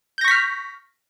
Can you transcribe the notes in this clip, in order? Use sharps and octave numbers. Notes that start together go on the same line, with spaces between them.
C#6 F6 G6 A#6 B6